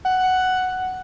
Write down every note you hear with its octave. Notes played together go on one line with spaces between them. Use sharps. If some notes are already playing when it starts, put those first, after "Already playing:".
F#5